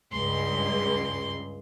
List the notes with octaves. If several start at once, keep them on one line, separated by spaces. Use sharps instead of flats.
C#2 G2 C6